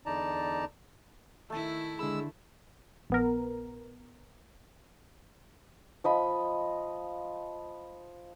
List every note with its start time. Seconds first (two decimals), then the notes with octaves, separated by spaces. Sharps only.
0.06 E2 D3 D#4 D5 A5 A#5
1.50 D#3 A3 E4 A5
1.99 D3 G#3 B5 E6
3.10 A#1 B3 A#4
6.04 F3 D#5 B5